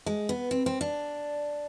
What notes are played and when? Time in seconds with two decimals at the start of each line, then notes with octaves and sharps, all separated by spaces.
0.06 G#3
0.29 B3
0.51 C4
0.66 C4
0.81 D4